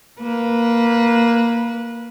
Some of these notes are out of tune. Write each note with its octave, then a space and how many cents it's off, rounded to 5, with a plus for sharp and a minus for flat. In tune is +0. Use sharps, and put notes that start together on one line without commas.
A#3 +0 B4 -15